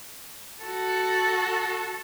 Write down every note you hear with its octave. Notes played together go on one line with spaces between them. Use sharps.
F#4 A4